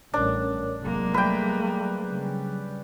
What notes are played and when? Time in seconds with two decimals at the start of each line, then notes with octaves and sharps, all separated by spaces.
0.14 A1 G3 C#4 D4 A#4 C#5
0.81 F1 F#3 G#3 A#3 G#4
1.14 G3 A3 B4 G5
2.09 C#3 G3